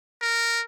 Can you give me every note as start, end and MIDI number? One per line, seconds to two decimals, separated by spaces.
0.21 0.62 70